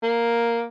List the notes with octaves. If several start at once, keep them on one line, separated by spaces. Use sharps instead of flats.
A#3